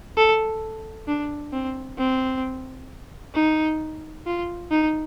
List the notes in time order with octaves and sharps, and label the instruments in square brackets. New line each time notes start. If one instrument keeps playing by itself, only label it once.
[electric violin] A4
D4
C4
C4
D#4
F4
D#4